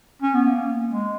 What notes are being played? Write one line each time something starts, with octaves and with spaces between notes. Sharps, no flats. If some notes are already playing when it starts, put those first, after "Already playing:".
C#4
B3
A#3
G#3